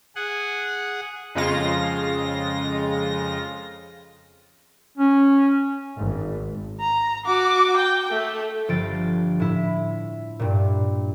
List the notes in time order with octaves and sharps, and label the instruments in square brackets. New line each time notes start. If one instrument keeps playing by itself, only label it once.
[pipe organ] G#4 F#5
[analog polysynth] F2 C#3 G#3 F4 A#6
[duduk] C#4
[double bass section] G#1
[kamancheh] A#5
F#4 D6
G5
A3
[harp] G1 F3 F4 A6 D7
A2 E4
G2 A#2